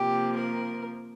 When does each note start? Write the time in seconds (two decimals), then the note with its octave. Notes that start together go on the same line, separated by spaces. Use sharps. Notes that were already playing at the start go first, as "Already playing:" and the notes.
Already playing: C3 F3 A#3 G4
0.37 A#4